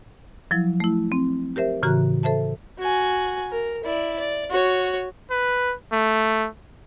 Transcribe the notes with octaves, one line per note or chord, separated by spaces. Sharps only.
F3 F#3 E4
A3 E4
C4
G4 A#4 C5 E5
A2 C#3 E3 F#4 A#5 F#6
A4 C5 E5 A5
F#4 G#5
A#4
E4 D5
D5
F#4 C#5
B4
A3